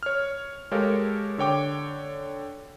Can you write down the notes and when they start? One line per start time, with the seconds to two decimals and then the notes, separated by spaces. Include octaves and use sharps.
0.03 C#5 F6
0.71 G#3 G4 A4 A#4 C#5 F5
1.38 D3 C#5 G5 D6